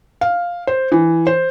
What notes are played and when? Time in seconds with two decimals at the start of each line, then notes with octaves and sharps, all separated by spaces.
0.21 F5
0.67 C5
0.92 E3
1.27 C5